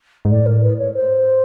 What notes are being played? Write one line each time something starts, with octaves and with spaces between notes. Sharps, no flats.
G#2
A2 D5
A#4
B4
C#5
C5